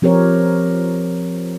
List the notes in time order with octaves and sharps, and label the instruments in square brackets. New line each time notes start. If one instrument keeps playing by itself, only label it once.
[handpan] F3 C4 G4 A#4 C#5